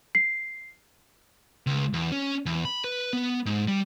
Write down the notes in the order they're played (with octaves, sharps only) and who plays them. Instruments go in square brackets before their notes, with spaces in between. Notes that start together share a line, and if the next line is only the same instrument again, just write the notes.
[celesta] C7
[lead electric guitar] C#2
E2
C#4
E2
B5
B4
B3
G#2
G3